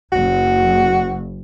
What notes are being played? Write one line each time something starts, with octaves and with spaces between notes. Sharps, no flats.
F#1 F#4